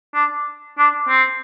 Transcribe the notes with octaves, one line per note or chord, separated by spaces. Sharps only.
D4
D4
C4